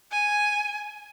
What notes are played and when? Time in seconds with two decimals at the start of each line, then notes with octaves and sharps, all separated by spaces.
0.11 G#5